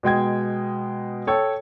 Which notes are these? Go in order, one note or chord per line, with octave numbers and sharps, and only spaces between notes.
B2 G#3 G5 G#6
A4 C#5 G5